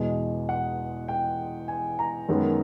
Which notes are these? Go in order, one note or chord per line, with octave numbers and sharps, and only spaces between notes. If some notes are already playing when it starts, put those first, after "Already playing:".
Already playing: E2 B2 G#3 D#5
F#5
G5
G#5
A#5
F#2 D#3 G#3 B3